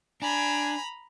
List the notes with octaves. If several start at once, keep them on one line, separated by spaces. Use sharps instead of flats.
D4 G#5 A#5 B5